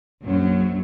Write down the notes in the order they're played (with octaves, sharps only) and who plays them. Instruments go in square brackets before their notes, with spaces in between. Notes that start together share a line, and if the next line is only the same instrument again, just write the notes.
[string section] A#1 F#2 F#3